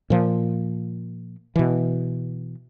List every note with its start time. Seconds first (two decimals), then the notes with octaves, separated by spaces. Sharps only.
0.10 A#2 F3
1.56 B2 E3